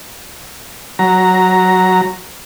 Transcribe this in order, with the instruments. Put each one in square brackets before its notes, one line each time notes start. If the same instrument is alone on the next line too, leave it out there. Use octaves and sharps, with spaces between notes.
[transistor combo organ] F#3 A#5